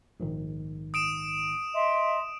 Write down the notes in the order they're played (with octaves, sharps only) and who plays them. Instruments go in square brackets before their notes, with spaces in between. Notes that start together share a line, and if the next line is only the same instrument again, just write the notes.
[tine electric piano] A#1 G#2 D#3
[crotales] D#6 D7 E7
[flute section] D#5 E5 C6